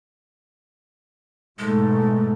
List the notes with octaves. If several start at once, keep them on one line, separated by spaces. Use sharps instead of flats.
G#2 B2 G#3 A3